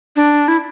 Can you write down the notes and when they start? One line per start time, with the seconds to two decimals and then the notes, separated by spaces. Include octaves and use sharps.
0.16 D4
0.48 E4